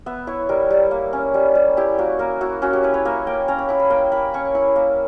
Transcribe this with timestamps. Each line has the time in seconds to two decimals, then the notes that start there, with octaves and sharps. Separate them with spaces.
0.06 B3 E5
0.27 E4 C#5
0.49 G3 A#4
0.70 G3
0.91 A#3
1.13 C#4
1.34 G3
1.55 G3
1.77 E4 G4
1.98 A#3 F#4
2.19 A#3 A#4
2.41 E4 F#4
2.62 C#4 F#4
2.73 G4
2.83 E4 B4
2.94 C#5
3.05 A#3 E5
3.27 A#3 G5
3.48 C#4 A#5
3.58 B5
3.69 E4 B5
3.79 B5
3.90 A#3 G5
4.12 A#3 B5
4.34 C#4 C#6
4.55 E4 B5
4.76 A#3